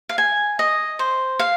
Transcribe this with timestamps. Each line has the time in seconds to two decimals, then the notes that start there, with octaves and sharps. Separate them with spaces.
0.09 F5
0.18 G#5
0.59 D#5
0.99 C5
1.39 F5